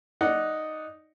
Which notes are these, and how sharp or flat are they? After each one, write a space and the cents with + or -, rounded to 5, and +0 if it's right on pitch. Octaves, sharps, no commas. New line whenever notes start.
D#4 +0 D5 +0 F#5 +0